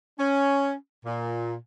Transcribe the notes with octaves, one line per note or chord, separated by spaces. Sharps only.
C#4
A#2